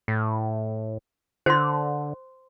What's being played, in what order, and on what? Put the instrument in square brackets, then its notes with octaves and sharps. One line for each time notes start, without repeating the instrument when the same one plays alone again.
[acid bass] A2
[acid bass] D3 [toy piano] C5 C6